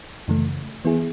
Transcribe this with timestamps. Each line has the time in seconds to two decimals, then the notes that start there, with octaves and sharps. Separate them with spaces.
0.28 F#2 C#3 E3 A3
0.85 E3 B3 E4 G#4